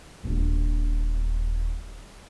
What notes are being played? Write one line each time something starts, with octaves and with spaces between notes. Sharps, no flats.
D#1 D4